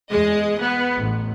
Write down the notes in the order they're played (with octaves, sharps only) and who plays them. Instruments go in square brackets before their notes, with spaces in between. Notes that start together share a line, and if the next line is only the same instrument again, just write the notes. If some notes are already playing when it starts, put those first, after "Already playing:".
[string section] E2 G#3 D#5
B3
A1